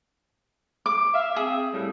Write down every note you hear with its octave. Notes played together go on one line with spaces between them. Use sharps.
D6
E5 F5
C4 G#4
A2 G3